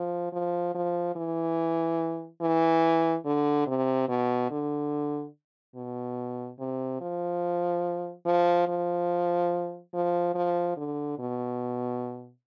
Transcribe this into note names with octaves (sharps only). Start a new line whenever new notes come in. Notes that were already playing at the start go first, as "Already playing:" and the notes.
Already playing: F3
F3
F3
E3
E3
D3
C3
B2
D3
B2
C3
F3
F3
F3
F3
F3
D3
B2